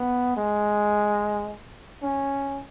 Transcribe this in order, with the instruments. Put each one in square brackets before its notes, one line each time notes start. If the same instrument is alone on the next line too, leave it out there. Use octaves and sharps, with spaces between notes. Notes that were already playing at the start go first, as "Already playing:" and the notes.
Already playing: [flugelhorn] B3
G#3
C#4